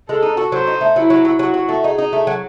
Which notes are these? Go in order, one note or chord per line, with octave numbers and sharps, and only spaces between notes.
G#3 A4
D#4
F#4
F#3 C5
D#4
A3
F#3 E4
F#3
F#3
F#3 F#4
F#3
A3
D#4 G#4
D#4
A3
F#3